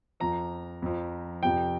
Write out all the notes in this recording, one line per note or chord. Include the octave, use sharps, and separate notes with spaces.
F2 F3 A#5
F2 F3
F2 C3 F3 G5